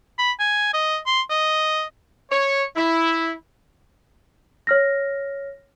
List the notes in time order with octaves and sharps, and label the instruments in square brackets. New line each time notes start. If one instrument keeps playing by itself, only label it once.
[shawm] B5
G#5
D#5
C6
D#5
[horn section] C#5
E4
[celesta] C#5 F6 A#6